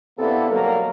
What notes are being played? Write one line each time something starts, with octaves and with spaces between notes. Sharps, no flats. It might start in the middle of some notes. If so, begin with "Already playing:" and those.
C3 A#3 B3 D4 E4 A4
B2 D3 F#3 G3 A#3 A#4